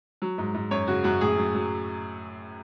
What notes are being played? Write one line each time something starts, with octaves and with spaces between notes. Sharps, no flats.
F#3
G#2
G#2
F#2 C#5
C#3 F#4
F#2 F#4
A2 G#4
F#3
F#3